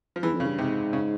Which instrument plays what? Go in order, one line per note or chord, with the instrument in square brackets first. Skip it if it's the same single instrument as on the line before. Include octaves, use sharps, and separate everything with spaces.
[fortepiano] F3
[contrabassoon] E2 [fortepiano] E3
[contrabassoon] F2
[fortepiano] C#3
[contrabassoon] G2
[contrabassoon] G#2 [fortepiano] C3
[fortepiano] C#3